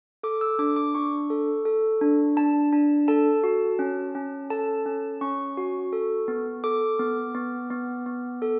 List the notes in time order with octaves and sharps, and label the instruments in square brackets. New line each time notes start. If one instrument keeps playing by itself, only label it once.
[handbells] A4 D6
E6
D4 D6
D6
D4 C#6
A4
A4
D4
D4 A5
D4
A4 A5
F#4
C#4
C#4
A4 A5
C#4
C#4 C#6
F#4
A4
B3
A4 D6
B3
B3
B3
B3
A4